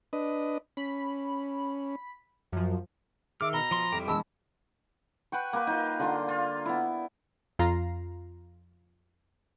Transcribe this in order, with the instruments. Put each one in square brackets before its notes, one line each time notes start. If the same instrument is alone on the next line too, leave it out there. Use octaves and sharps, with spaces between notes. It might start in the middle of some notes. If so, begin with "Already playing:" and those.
[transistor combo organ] D4 B4 D#5
[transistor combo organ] C#4 [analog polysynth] B5
[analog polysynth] F#2 F3 [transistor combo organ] F#3
[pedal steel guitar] D#3 F6 [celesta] G#4 E5 E6 [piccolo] D6
[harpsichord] B2 [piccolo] A#5 [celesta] B5 G7
[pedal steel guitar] F3 C6
[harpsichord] F2 [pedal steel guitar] G3 E4 G4
[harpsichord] A#1 E2 G#3 [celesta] A5 B5 [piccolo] E6
[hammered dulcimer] B4 F#5 G5 C#6
A#3 A#4 B4
D#4 F4
D3 F4 A#5 C6
F4
B3 E4
[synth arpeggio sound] F2 F4 A#5 C7